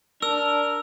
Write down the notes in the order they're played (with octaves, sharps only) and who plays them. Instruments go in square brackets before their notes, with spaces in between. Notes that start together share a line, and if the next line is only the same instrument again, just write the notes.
[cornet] D4 [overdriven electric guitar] A#4 [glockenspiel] E6